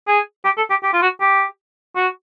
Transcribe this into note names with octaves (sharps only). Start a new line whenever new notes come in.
G#4
G4
A4
G4
G4
F4
F#4
G4
F#4